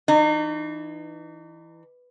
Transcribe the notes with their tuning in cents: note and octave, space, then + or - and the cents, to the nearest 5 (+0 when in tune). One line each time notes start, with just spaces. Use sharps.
E3 +0 D#4 -35